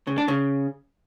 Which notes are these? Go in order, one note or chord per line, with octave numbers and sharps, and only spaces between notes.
C#3
D4
C#3